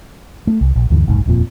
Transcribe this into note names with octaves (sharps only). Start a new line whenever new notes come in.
A3
C2
A#1
D2 G2 D3 E3
F1 B1 G#2
D#1 F2 A#2